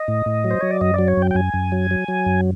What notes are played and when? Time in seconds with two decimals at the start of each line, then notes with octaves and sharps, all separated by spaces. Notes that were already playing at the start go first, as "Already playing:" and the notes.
Already playing: D#5
0.08 A2
0.26 A2
0.44 F#3
0.51 C5
0.61 F#3 C#5
0.71 D5
0.81 F#2 D#5
0.94 F#3 D5
1.08 C#5
1.17 F#2 G5
1.31 G5
1.35 F#2 G#5
1.54 F#2
1.72 F#3
1.91 F#3
2.08 F#3
2.26 F#2